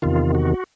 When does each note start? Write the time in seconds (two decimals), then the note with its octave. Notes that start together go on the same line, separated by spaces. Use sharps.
0.02 E2 C3 D#3 F4
0.35 F#4